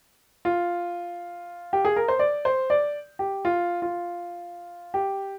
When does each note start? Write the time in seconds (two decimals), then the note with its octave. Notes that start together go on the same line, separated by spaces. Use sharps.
0.45 F4
1.73 G4
1.85 G#4
1.96 A#4
2.08 C5
2.19 D5
2.45 C5
2.70 D5
3.19 G4
3.45 F4
3.82 F4
4.94 G4